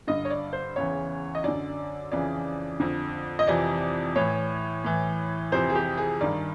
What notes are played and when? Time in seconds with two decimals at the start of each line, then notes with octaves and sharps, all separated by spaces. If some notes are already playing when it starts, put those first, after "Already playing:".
0.07 G2 D3 D#5
0.25 C#5
0.30 D5
0.53 C5
0.76 E2 C#3 E3 C#5
1.35 D#5
1.44 F#2 D3 D5
2.12 F2 C#3 E3 D5
2.80 F2 D3
3.39 D#5
3.47 F2 C3 E3 D5
4.16 A2 E3 C#5
4.84 A2 E3
5.52 F2 C3 E3 C5
5.69 G#4
5.75 G4
5.98 G#4
6.20 G2 D#3 D5